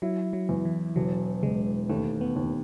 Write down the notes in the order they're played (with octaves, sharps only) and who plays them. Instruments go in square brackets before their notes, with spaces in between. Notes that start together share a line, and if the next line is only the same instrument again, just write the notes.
[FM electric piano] F#3 [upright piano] E4
[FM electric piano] F#3
[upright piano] E2
[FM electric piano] E3
[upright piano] E1 [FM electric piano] F#3
[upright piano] E1 [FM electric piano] G#3
[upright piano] D#2 [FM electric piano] A3
[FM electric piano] B3
[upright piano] D#2